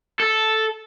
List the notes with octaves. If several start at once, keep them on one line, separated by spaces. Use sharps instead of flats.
A4